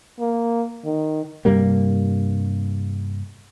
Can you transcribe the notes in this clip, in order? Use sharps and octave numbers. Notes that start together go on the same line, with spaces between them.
A#3
D#3
G2 C3 G3 A#3